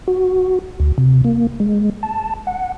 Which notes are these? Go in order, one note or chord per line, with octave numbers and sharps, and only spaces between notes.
F#4
D2
C3
A#3
G#3
A5
F#5